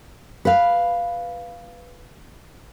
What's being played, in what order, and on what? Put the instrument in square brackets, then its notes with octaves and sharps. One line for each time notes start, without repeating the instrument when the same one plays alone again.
[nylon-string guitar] B4 F5